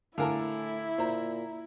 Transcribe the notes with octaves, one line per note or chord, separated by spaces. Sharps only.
A2 D3 E4 A#4 F5 G#5 A5
A#2 C5 A#5